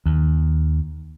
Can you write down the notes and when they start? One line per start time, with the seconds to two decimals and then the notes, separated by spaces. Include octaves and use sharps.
0.06 D#2